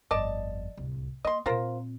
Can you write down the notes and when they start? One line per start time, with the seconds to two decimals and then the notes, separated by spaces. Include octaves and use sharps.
0.11 G1 F2 D5 D#5 A5
0.77 D1 C2
1.25 A#3 D#5 C6
1.46 A#2 C4 F4 A#4 C5